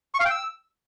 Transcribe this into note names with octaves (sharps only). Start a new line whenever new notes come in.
C#6
F5
G5
E6